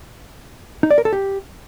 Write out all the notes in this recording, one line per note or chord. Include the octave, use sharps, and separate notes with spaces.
D#4
D5
A#4
A4
G4